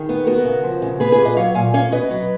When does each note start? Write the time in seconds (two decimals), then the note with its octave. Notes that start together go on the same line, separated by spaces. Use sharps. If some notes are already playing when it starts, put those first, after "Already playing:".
Already playing: D#3 G#4
0.09 B3
0.27 B3 F#4 A#4
0.45 C#3
0.63 F3
0.82 C#3
1.00 B3 G#4 B4
1.12 G#4 B4
1.18 A#2
1.25 B4 D#5
1.36 F#3 C#5 F5
1.55 A#2 F5 G#5
1.74 C#4 C#5 F5
1.92 B2 B4 D#5
2.11 F#3